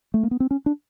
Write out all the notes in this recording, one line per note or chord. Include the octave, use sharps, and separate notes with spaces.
A3
A#3
B3
C4
C#4
D4